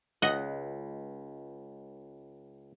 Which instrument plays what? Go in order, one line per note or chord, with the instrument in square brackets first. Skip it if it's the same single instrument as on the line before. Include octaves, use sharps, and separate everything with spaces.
[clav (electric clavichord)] C#2 [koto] D#5 F#5